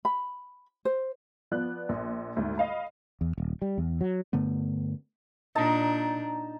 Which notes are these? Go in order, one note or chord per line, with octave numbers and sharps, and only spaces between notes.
B5
C5
F3 B3 D5 F#6
A#1
D2 G#2
D#5 F5 B5
E2
D#1
G3
E2
F#3
G2 D3 A3 B3
A#2 D4 D#4 A5 A#5